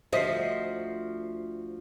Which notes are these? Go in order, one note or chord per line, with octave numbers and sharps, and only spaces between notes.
D2 F3 F#4 C5 D#5 E5 B6 C7